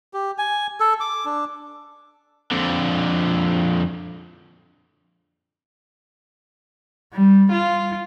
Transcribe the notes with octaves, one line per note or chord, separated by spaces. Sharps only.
G4
G#5
A4
D6
D4
F2 D3
G3
F4